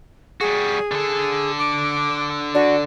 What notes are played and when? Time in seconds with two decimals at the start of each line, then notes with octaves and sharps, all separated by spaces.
0.41 G3 F#4 G#4
0.92 D3 A4
1.59 D6
2.55 D4 F#4